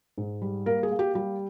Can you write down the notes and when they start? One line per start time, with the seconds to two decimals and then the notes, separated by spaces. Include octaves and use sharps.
0.18 G#2
0.42 G3
0.66 A#3 A#4
0.83 G#4
0.91 A#3
0.99 G4
1.15 G3 G4